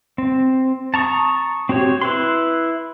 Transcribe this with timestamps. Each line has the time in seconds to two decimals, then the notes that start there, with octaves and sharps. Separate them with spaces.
0.18 C4
0.94 A5 A#5 C#6 D#6
1.69 C4 F#4 G4 C#5
2.01 E4 B4 C6